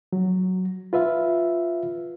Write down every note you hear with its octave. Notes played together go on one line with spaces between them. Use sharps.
F#3
F4 B4 E5 F5